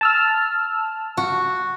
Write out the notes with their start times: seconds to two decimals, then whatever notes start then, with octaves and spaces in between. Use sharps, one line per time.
0.01 A5 E6 F6
1.17 F#4